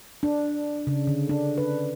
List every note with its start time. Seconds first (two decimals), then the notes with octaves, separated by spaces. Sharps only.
0.23 D4
0.87 C#3
1.07 D3
1.29 D4
1.58 B4